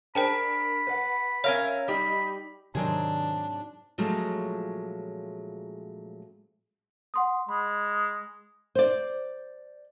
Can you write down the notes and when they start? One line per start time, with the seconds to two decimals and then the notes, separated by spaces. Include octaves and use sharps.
0.15 D4 G#4 A#4 C5 G5 A5 B5
0.87 B4 F#5
1.44 C#4 A#4 C#5 E5 F5
1.88 G3 D#4 G4 B5
2.75 G#2 C3 D#3 F#3 C4 D4 G#4
3.98 A#2 C#3 F3 F#3 G#3 A3
7.14 F#5 C6 D#6
7.49 G#3 B5
8.75 C5 D5